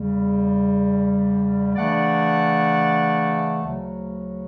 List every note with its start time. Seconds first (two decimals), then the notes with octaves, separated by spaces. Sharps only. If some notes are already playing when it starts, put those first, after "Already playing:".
Already playing: E2 C#3 G3
1.75 C#3 E3 A3 D4 D5 F#5
3.63 D2 C#3 F#3